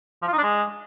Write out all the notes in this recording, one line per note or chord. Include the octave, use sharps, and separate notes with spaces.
F3
F4
D#4
D4
G#3